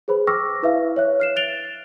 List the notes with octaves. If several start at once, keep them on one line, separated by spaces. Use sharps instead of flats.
G#4 B4 C5 B5
G5 C#6 D6 E6 F6 A#6
E4 B4 E5 F5
C#5 E5 F#6
F6 C7 E7
F#6 A6 D7 F7 G7